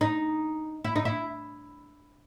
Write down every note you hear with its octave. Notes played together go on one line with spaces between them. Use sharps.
D#4
E4
D#4
E4